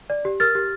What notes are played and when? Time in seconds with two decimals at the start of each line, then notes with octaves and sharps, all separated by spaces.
0.10 D5
0.25 G4
0.40 A#4 F6 A6
0.55 G4